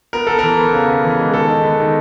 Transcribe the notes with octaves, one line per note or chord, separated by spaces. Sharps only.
B3 A#4
B3 A4
E3 A#4
B3
C#3
B3
E3
G#3
D#3 A4
D#3
B3
D#3